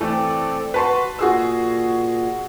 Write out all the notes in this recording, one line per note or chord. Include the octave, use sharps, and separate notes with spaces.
E3 A3 C4 A4 D5
F#4 B4 A5 C6
A#2 F#4 G#4 E6